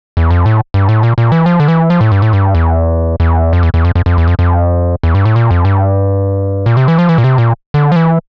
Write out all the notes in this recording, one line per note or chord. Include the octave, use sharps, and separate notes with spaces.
E2
F2
A2
G2
A2
A#2
A#2
E3
F3
D3
E3
F3
A2
G2
A2
G2
E2
E2
F2
E2
E2
F2
F2
F2
E2
F2
F2
E2
G2
A2
A#2
F2
G2
A#2
C3
E3
F3
E3
A#2
C3
A#2
D3
F3
E3